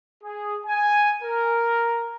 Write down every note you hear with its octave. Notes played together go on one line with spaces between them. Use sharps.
G#4
G#5
A#4